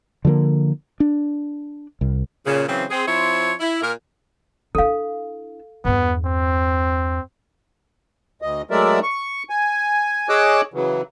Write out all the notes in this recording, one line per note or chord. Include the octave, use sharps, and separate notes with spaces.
D3 F3 G3 A#3
D4
C2
A#2 C#3
C#3 E3 F#3 C4
C4 G#4
F3 C4 E4 C5 C#5
E4
A#2 A#4
D4 E4 A4 F5
E2 G2 B3
C4
D2 D#5
F#3 G#3 A3 A#4 D5 E5
C#6
G#5
G#4 C#5 D#5 D6 E6 F#6
C#3 E3 F#3